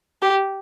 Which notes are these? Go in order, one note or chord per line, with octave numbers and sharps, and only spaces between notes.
G4